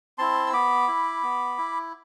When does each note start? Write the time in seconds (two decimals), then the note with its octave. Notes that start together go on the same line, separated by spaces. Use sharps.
0.18 C4 E4 A5 C6
0.47 E6
0.53 B3 B5 D6
0.88 E4
1.23 B3
1.58 E4